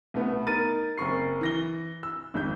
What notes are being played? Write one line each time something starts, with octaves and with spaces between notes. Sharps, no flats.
C2 A3 B3
D#4 A#4 A6 D#7
F#1 C4 A#4 C#6 C7
E3 A#6 G7
E6
G#1 F2 G6